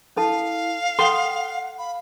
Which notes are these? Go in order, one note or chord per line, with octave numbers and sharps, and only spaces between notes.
C#4 E4 A4 F5 A5
A4 F#5 G5 C6 D#6
F5 B5